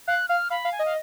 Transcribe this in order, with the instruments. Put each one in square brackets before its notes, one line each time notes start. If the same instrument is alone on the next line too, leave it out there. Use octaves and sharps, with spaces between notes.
[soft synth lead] F5 [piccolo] F#6
[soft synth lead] F5 [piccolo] F6
[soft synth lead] F5 [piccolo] B5
[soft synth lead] F5
[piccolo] G#5
[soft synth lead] D#5
[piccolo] F5